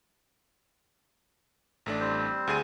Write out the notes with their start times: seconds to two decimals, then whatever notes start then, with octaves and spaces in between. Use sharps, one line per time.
1.86 A1 A3 D4
2.00 G3 C4 C5
2.47 D2 G#4 D#7